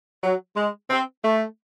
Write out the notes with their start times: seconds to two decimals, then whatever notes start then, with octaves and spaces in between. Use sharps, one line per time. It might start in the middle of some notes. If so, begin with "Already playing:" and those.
0.23 F#3
0.57 G#3
0.90 C4
1.23 A3